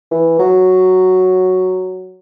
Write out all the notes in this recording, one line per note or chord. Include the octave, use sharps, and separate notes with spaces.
E3
F#3